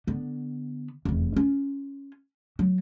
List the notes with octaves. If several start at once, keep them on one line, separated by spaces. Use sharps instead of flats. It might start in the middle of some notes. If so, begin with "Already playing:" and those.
D3 B3
F1 E2
C#4 F4
F#3